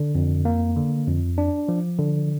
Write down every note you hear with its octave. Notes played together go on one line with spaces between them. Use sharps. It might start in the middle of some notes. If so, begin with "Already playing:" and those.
Already playing: D3
F2
A#3
D3
F2
D4
F3
D3